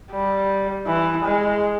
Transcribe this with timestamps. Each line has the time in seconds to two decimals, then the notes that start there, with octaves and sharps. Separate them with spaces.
0.12 G3
0.87 E3
1.25 G#3